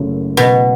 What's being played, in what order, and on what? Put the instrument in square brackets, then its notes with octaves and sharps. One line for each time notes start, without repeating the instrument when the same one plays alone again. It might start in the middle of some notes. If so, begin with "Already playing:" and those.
Already playing: [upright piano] F#1 F#2 C#3 F#3 A3
[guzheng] B2